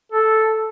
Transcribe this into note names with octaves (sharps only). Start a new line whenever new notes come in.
A4